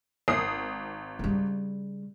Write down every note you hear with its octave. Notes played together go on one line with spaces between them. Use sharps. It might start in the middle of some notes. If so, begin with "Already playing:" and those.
G#1 D#6 C7
C#3 G3